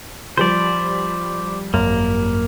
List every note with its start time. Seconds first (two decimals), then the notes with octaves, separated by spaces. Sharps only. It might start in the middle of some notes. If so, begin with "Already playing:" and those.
0.37 F3 G3 C5 D5
1.74 G#1 F#2 A#3